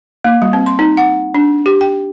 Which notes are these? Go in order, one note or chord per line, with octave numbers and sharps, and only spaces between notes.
A#3
G3
C4
C6
D#4
F#5
D4
G4
G5